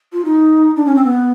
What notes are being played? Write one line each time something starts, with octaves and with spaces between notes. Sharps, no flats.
F4
D#4
D4
C#4
C4
B3